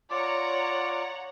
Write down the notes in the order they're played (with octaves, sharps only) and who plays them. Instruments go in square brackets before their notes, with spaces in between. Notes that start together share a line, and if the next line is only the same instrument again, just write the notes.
[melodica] F4 D5 D6 [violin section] C#5 F#5 A#5